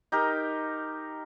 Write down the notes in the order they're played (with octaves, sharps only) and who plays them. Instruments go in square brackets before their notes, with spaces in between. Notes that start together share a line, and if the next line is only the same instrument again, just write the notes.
[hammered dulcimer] D#4 G4 A#4